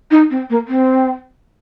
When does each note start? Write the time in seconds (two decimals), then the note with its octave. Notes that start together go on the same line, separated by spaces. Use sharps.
0.11 D#4
0.31 C4
0.50 A#3
0.68 C4